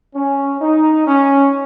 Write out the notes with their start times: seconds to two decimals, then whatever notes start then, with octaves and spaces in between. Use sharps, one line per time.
0.15 C#4
0.61 D#4
1.07 C#4